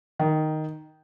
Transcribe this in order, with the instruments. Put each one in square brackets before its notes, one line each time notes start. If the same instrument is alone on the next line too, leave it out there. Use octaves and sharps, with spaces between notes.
[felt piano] D#3